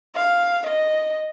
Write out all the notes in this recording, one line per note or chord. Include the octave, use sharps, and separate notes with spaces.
F5
D#5